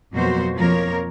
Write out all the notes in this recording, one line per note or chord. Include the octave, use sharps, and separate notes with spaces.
F2 B2 F#3 A#3 F#4 C5
F2 F3 A#3 A#4 C#5